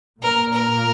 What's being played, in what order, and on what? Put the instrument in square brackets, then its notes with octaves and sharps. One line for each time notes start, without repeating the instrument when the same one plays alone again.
[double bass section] A#2 A#3 [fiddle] A#4
[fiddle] A#4